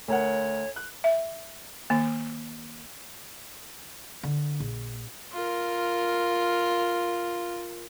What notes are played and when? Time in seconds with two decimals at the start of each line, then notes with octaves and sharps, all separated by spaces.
0.08 D2 A#4 C#5 F#5
0.76 F#6
1.04 E5
1.90 D#3 A#3
4.23 D3
4.60 A#1
5.32 F4 A#4